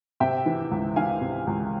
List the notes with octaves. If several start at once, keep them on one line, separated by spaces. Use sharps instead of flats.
C3 E5 G5
E3
C#2
E3 F5 G#5
C3
C#2